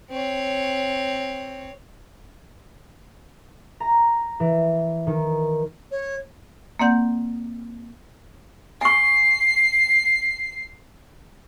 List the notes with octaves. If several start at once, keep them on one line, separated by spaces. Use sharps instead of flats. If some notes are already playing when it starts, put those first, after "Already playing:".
C4 C#5
A#5
E3
D#3
C#5
A#3 C4 D5 F#5 G6
G#5 C#6 C7